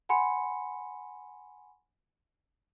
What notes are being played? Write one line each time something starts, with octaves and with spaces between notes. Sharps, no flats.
F#5 G#5 B5 C6 C#7